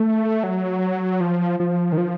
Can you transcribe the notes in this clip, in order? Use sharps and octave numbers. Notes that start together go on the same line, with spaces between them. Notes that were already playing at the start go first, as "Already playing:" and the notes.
Already playing: A3
F#3
F3
F3
D#3
F3